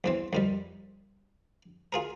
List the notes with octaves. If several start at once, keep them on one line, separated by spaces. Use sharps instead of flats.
E2 E3 C4
F2 D#3 G3
F4 G#4 A#4